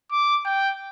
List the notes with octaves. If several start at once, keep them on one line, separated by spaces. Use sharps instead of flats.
D6
G5